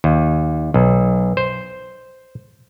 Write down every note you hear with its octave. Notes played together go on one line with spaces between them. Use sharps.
D#2
B1
C5